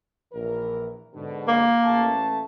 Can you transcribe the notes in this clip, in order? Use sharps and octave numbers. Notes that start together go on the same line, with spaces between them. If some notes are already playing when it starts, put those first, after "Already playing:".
A#1 E3 A#4
G#2 B2 D3
A#3
A1 A3 A5